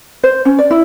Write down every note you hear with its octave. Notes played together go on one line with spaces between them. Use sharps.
C5
C#4
D5
E4